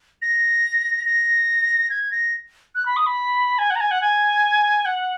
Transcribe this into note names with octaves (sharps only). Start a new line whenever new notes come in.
A#6
A#6
G#6
A#6
F#6
B5
D#6
B5
G#5
F#5
A#5
G#5
F#5
G#5
F#5